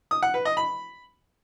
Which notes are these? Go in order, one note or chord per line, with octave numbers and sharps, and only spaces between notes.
D#6
F#5
B4
D#5
B5